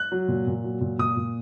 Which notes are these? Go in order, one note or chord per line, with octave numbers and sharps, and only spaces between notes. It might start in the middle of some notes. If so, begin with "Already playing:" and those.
Already playing: F#6
F#3
A#2
A#2
F#3
A#2
A#2 D#6
A#2